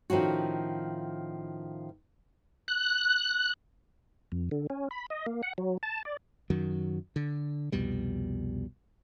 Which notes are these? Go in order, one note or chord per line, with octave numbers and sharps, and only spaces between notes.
A2 D#3 F3 C#4 F#4
F#6
F2
D3
C#4
B5
D#5
A#3
F#5
F#3
A5
D5
F#2 D#3 F#3
D3
C2 F2 B2 G3